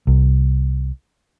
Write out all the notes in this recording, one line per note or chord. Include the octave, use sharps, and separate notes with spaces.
C2